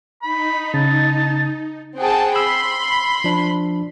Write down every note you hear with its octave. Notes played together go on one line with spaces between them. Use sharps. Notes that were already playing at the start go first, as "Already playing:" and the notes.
D#4 B5
C#3 A5
C4 G#4 F#5 G5 A5
B5 C6 E6
F3 D4